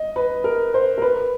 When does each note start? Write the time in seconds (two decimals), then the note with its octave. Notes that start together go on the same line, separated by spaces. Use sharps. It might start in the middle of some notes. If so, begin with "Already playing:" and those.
Already playing: D#5
0.16 B4
0.44 A#4
0.74 C5
0.98 A#4
1.02 B4